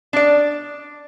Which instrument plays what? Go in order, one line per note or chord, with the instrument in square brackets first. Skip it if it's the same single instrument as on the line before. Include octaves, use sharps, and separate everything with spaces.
[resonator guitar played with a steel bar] D4 D5